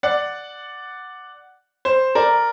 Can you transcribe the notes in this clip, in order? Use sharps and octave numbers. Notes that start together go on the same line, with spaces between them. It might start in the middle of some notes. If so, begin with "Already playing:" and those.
D5 F#5
C5
A#4 D5